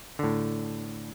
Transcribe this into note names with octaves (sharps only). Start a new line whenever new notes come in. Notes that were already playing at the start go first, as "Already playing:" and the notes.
A2 D3